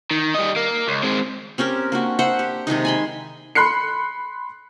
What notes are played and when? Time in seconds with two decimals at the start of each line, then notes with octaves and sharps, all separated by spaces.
0.11 D#3
0.35 G3 D#5
0.57 A#3
0.88 C#2
1.03 G#3 C4
1.58 C4 C#4 G4 A#4
1.92 A#3 D4 F#4
2.19 C5 E5 F#5
2.39 G4
2.67 C3 D#3 G#3 D#4
2.85 G#5 B5 C6
3.55 B5 C6 F#6 C7 C#7